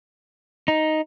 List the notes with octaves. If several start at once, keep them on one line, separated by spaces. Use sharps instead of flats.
D#4